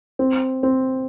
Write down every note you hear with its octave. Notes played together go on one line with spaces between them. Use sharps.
C4
C4